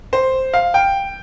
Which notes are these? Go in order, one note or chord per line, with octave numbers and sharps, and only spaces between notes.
C5
F5
G5